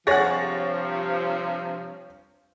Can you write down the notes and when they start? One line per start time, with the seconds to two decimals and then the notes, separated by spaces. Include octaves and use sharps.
0.07 G2 C3 F3 G#4 C#5 F#5 A6 A#6